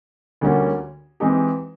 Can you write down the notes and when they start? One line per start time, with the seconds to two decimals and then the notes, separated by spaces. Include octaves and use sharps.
0.41 D2 D3 G3 A#3 C#4
1.20 E3 G#3 C4 D#4 G4